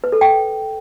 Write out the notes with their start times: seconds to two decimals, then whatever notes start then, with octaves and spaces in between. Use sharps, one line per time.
0.04 B4
0.12 A4
0.21 G5